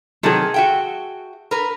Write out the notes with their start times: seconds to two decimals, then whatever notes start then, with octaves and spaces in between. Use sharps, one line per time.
0.23 C3 D#3 F#3 G#4 A4
0.54 F#4 E5 G5
1.51 A#4 B4